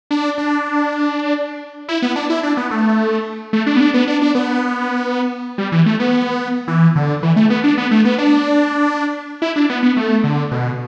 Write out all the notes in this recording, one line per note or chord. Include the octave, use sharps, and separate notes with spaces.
D4
D4
E4
B3
D4
E4
D4
B3
A3
A3
D4
B3
D4
B3
D4
D4
B3
G3
E3
A3
B3
E3
D3
E3
A3
B3
D4
B3
A3
B3
D4
E4
D4
B3
B3
A3
D3
B2